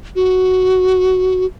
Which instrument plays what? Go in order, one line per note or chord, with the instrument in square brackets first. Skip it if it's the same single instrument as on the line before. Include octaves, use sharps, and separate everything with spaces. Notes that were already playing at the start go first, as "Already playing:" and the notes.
[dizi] F#4